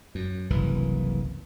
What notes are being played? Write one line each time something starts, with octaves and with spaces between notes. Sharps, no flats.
F#2
F#1 C2 E3